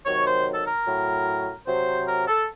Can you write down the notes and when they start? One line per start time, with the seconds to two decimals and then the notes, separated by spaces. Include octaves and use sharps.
0.06 C3 D#3 F#3 C#5
0.27 C5
0.54 A4
0.67 A#4
0.87 A2 F#3
1.67 C3 F#3 C5
2.08 A#4
2.28 A4